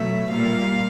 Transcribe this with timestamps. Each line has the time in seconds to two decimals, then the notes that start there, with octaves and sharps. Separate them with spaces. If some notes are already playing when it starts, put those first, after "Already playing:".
Already playing: B2 F#3 A3 E5
0.30 A#2 G3 A#3 F5